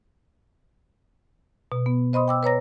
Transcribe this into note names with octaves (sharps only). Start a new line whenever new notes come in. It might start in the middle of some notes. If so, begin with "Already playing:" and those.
B2
B3
C5 D#5 B5 C6 D#6
G5 D6 E6
B4 C#5 A#5 A#6